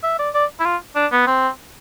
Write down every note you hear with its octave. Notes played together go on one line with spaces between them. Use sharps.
E5
D5
D5
E4
F4
D4
B3
C4